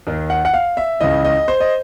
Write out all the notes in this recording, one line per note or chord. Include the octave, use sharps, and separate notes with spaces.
D#2 D#3
F#5
F#5
F5
E5
C#2 C#3 E3 D#5
D#5
C5
D#5